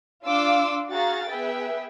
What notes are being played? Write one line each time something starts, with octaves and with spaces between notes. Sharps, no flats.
D4 F4 F5 C6 D6 E6
F#4 G#4 F5 A#5 A6
B3 G#4 B4 E5 G5